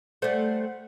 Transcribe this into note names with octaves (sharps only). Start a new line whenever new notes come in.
G3 A3 C5 F#5